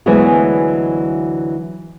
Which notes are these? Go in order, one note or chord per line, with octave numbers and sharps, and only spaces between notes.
D2 E3 F#3 G#3 B3 G#4